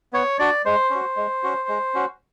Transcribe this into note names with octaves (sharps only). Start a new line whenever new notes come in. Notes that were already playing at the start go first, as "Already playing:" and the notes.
B3 C#5
D4 F#4 D5
G#3 C5
C#4 F#4
G#3
C#4 F#4
G#3
C#4 F#4